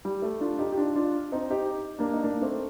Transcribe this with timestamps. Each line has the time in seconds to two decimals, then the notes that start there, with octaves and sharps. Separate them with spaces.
0.05 G3
0.22 A3
0.41 D4 F4
0.59 D#4 G4
0.72 G4
0.77 D4 F4
0.95 D4 F4
1.32 C4 D#4
1.51 D#4 G4
1.99 A#3 D4
2.13 D#4
2.23 A#3 D4
2.42 A3 C4